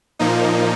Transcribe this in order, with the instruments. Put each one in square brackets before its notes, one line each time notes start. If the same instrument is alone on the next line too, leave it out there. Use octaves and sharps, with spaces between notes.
[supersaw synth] A#2 F3 A#3 D#4